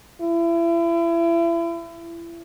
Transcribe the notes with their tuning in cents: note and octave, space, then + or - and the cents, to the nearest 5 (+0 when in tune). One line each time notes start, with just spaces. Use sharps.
E4 +35